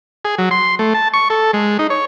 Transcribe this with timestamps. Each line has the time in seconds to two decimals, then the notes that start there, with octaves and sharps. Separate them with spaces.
0.25 G#4
0.38 F#3
0.51 C6
0.79 A3
0.94 A5
1.14 C#6
1.30 A4
1.53 G#3
1.79 D#4
1.90 C#5